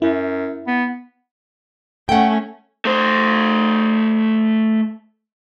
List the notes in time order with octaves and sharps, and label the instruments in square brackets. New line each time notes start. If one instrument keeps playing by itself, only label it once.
[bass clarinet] F#2 [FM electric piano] E4
[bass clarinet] B3
[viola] A3 C#4 [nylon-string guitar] F#5 G5
[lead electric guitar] A3 C5